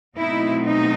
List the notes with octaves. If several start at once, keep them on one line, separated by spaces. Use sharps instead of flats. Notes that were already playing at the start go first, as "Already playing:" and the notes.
B2 F#3 A3 C4 D#4 E4
D#4